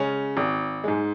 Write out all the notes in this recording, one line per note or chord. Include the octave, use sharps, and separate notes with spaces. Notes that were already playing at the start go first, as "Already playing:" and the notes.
Already playing: C#3 G#3 C#4
G#1
G#2 G#3